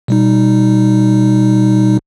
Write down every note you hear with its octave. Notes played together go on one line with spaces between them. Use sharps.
B2 G3 D#4